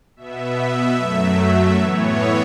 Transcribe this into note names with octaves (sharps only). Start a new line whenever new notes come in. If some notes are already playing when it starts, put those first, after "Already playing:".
B2 B3 E5
F#2 F#3 A3
A2 E3 B3 C#5
E5